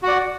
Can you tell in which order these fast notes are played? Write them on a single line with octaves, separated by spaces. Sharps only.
F#4 F#5 D5